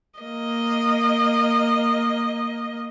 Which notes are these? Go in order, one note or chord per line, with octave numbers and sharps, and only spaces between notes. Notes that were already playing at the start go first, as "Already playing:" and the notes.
A#3 D#5